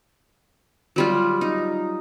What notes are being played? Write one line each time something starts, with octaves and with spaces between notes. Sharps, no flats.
F#3 G3 F4
D#4